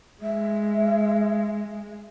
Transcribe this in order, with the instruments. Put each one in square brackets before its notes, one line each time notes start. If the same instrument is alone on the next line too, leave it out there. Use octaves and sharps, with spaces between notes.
[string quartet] G#3 [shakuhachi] E5